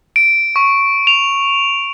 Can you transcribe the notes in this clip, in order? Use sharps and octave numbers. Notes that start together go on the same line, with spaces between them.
D7
C#6
F7